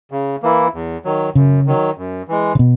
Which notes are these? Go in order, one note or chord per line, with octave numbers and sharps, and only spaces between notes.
C#3
E3 A#3 E4
E2
D#3 F#3
F#2 C#3
D#3 F#3
F#2
E3 G#3
C#3
B2